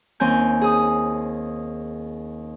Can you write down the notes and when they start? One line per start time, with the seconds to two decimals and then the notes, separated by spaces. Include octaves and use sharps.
0.20 D#2 C4 C#4 G#5 G6
0.61 G#4 D#6